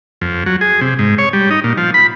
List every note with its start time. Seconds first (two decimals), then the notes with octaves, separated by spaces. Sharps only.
0.21 F2
0.46 F#3
0.61 G#4
0.81 C3
0.99 G#2
1.18 C#5
1.33 G3
1.50 D#4
1.64 A#2
1.77 F3
1.94 B5